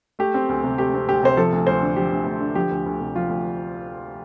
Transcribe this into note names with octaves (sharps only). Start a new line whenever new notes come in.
A3 G4
C4
D2
C3
A3 G4
C4
D2 G4
C3 C5
F3 A4
D2
D2 C5
D3
F3 G4
D2
D2
D3
F3 G4
D2
D2
C3
F3 F4
D2